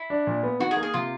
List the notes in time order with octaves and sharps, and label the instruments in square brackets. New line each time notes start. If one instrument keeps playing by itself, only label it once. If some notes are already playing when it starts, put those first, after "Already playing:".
Already playing: [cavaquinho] E4
[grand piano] D4
A#2
B3
[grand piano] D#3 [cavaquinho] F#4
[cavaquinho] G#4
[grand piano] A#3
[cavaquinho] G#4
[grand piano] C3 [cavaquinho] F4